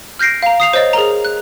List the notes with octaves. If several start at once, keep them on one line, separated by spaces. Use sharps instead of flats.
F6 G6 A#6 C7 D7
F5 A#5
D#6 C7 F7
C5 C#5 D#5 A6
G#4 A#4 A#5
F#6